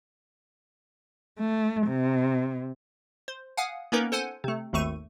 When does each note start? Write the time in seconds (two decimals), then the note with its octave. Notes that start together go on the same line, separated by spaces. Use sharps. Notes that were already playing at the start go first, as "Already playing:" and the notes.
1.40 A3
1.88 C3
3.28 C5
3.57 F5 F#5 G#5 D#6
3.92 A#3 B3 C#4 D#4 A#4 B4
4.12 A4 C5 F#5 G#5
4.44 C3 A3
4.73 G#1 D#2 A3 C#6 D#7